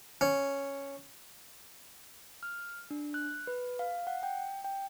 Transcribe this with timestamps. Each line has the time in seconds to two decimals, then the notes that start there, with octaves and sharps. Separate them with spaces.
0.21 C#4
2.43 F6
2.91 D4
3.14 F#6
3.47 B4
3.79 F5
4.07 F#5
4.23 G5
4.64 G5